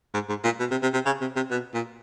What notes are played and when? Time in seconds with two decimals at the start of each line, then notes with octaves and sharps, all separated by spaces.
0.14 G#2
0.29 G#2
0.44 A#2
0.60 B2
0.71 C3
0.83 C3
0.94 C3
1.06 C#3
1.21 C3
1.36 C3
1.51 B2
1.74 A#2